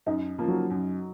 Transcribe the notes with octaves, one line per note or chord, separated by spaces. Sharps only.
F#2 D#4
C#3 F3 A#3 F4
F#3
F#2